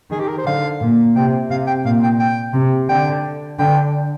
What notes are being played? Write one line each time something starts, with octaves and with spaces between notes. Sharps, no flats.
D#3 G#4
G4
A#4
C5
D3 F5
A#2
C3 G5
C3 F5
G5
A#2 F5
G5
G5
C3
D3 G5
D3 G5